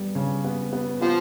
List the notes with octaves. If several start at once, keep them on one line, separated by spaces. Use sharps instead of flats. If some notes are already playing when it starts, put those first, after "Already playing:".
Already playing: G3 B3
C#3
B3
B3
F3 B3